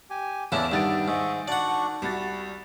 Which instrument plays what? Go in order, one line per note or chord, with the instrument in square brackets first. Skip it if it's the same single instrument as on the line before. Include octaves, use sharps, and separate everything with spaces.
[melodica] G4 G#5
[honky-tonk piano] E2 E7 [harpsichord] C#3 E4 [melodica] A4 D5 F#5
[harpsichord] G2 B3 [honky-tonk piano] D#3 A6 D7 [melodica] E5
[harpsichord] G#2 [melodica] D#5 E5 C#6
[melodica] D4 F#4 C#6 [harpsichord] D5 F#5
[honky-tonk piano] C2 F#4 A6 [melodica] B5